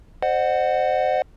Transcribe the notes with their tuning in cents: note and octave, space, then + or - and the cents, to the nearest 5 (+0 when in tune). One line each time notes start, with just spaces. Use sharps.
C5 +0 D#5 -40 F#5 +0